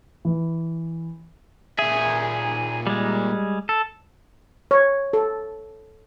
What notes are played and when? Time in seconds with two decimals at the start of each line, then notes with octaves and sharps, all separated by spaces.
0.25 E3
1.79 A#2 G#4 E5
2.87 G3 G#3
3.69 A4
4.71 C#5
5.13 A4